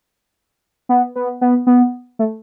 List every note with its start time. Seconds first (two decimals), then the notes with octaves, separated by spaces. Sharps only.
0.89 B3
1.16 B3
1.41 B3
1.67 B3
2.19 A3